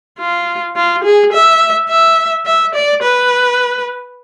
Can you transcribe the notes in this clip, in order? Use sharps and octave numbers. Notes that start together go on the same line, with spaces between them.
F4
F4
G#4
E5
E5
E5
D5
B4